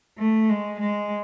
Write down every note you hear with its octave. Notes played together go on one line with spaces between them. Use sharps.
A3
G#3
G#3